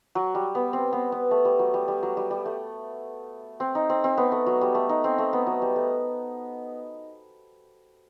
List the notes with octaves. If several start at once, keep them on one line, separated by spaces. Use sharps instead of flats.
F#3
G3
B3
C4
B3
B3
A3
G3
F#3
G3
G3
F#3
G3
G3
A3
C4
D#4
C4
C4
B3
A3
F#3
G3
A3
D#4
C4
A3
B3
F#3
G3
A3